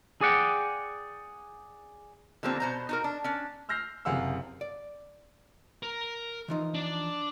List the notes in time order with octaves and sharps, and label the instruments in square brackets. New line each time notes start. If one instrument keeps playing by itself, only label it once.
[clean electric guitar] G#4 D5 F#5 G5
[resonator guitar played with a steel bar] D3 F3 G3 A#3 C4
B2 C5 A#5
D#4 F#4 A#4
D4
C#4 D4
[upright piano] E6 F6 G6 A#6 C7
F#1 C3 G#4 F5 F#5 E6
[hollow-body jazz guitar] D5
[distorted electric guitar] A#4
[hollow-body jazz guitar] E3 F3 D#4
[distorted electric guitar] D4 D5